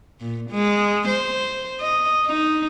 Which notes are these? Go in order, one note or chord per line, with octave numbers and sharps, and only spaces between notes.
A#2
G#3
C5
D#5
D#4